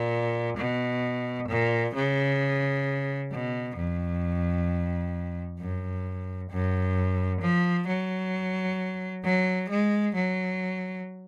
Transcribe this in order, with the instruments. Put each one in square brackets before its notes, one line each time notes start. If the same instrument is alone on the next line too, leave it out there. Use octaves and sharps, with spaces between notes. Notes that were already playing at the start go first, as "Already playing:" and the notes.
Already playing: [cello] A#2
B2
A#2
C#3
B2
F2
F#2
F#2
F3
F#3
F#3
G#3
F#3